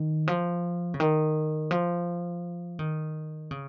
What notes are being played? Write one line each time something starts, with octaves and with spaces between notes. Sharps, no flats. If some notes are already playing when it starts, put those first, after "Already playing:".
Already playing: D#3
F3
C#3
D#3
F3
D#3
C#3